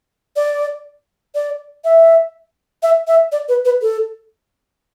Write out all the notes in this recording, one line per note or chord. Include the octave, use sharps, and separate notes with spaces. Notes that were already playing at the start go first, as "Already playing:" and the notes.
D5
D5
E5
E5
E5
D5
B4
B4
A4